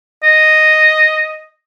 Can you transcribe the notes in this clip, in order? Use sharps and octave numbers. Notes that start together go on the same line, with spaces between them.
D#5